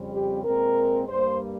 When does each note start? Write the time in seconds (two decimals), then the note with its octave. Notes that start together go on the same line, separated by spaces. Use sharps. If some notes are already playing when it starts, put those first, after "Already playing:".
Already playing: F2 C#3 G3 C4
0.13 G4
0.44 A#2 G#3 C4 A#4
1.08 G2 G3 A#3 C5